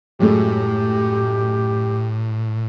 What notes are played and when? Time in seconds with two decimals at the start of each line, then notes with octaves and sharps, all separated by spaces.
0.20 F#2 A2 G#3 A3 G4